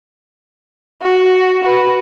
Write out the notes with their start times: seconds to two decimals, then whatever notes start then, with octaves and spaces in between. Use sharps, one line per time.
1.02 F#4
1.64 F#4 B4